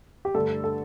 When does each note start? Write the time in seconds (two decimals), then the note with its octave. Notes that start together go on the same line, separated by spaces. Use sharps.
0.25 G4
0.34 G2 D3 A3 A4
0.64 A4